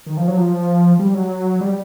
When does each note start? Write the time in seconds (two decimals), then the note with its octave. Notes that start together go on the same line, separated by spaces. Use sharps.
0.06 D#3
0.17 F3
0.28 F#3
0.37 F3
0.99 G3
1.14 F#3
1.61 G3